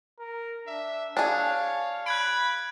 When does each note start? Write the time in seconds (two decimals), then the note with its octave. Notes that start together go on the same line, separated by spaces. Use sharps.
0.19 A#4
0.67 D4 E5
1.17 D4 G#4 C#5 F5
2.06 B5 F#6 G#6 D7